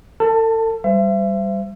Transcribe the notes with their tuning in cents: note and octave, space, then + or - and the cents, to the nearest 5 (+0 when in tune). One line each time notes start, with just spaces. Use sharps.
A4 +40 A5 +15
G3 +0 C5 -25 E5 +40